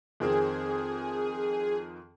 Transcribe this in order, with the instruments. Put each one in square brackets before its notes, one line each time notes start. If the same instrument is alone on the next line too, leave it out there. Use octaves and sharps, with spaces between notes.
[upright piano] F2 D#3 C4 [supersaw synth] G#4